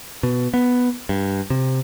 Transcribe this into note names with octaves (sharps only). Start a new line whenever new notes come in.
B2
B3
G2
C3